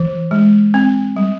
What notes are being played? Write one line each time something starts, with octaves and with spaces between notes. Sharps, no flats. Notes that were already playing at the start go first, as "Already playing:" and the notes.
Already playing: E3
G#3
C4
G3